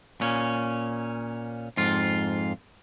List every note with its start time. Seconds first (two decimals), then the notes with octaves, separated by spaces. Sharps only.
0.21 A#2 C#4
1.77 F2 G#2 F4